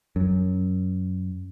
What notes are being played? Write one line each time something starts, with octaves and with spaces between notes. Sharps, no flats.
F#2